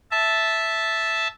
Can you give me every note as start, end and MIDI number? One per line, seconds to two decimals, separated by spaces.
0.11 1.28 76
0.11 1.28 81